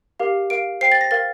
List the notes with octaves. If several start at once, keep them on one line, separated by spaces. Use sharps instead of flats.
G4 A#4 F5
A#4 F5 D7
C5 G5 C7
A6
A#6
A#4 F5 A6